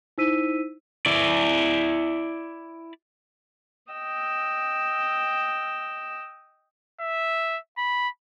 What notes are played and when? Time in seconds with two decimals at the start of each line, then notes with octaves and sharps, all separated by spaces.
0.18 D#4 E4 C5 E6 B6 D#7
1.06 E4 D5
3.93 D#5 G5 E6
7.00 E5
7.78 B5